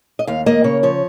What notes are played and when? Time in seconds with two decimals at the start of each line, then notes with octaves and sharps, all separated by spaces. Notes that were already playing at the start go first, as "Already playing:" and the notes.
0.19 D#5
0.27 D#2 F5
0.46 A#3 D#5
0.64 C#3 C#5
0.83 F3 C#5